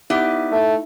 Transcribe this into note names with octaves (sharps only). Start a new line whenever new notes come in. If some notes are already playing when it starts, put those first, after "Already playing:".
B3 D#4 E4 G4 D5 E5
A3